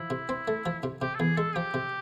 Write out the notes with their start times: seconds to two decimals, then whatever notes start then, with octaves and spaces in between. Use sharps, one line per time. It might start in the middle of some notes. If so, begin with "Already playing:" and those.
Already playing: F3 E4
0.10 C3
0.29 C4
0.48 A3
0.66 F3
0.83 C3
1.01 C3 G4
1.15 A4
1.20 E2 G#4
1.38 G#3 A4
1.56 F3 G4
1.74 C3